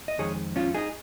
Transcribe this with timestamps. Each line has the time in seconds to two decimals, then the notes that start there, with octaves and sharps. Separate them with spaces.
0.08 D#5
0.18 F2 D#3 G#3 G#4 C#5
0.56 C#4 F4
0.74 D#4 G#4